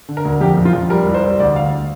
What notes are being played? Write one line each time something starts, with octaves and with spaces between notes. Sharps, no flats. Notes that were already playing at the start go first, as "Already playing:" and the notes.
D3
A#4
D2
F2 G4
F2
F4
F2
G3 A#4
C2
C5
C2
D2 D5
D2 F5